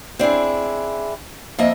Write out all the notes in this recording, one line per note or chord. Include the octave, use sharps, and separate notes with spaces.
C4 D4 E4 G#4
F2 A#3 D#5 E5